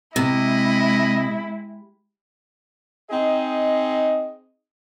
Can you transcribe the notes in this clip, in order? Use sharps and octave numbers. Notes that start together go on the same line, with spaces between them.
C3 G#3 E4 D#5
C4 D#4 G#4 D#5